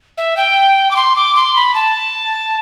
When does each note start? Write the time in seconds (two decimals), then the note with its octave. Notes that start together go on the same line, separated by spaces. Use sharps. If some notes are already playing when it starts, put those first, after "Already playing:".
0.18 E5
0.37 G5
0.91 D6
0.96 C6
1.16 D6
1.36 C6
1.56 B5
1.74 A5